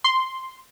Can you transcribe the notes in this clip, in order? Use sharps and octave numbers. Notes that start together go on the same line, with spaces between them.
C6